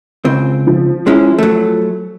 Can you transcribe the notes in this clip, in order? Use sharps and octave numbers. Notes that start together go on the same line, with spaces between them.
C#2 C4
F3
G#3 C#4 E4
F#3 A3